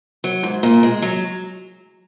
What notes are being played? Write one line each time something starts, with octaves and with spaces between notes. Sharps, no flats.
F#3
G#2
A#2
G#3
F#3